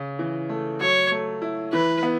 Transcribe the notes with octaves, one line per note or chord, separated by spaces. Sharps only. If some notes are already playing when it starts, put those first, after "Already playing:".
Already playing: C#3
E3
A3
F#3 C#5
A3
E4
E3 B4
B3